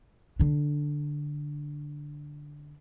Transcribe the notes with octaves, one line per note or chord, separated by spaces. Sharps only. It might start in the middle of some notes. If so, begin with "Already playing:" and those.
D3 D4